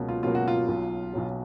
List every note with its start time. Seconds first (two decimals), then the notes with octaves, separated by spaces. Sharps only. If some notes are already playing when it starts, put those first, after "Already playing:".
Already playing: C#2 B2 F#3 A#3
0.09 F4
0.23 C#2 B2 F#3 A#3 F4
0.35 F#4
0.48 F4
0.68 B1 B2 F#3
1.13 B1 B2 F#3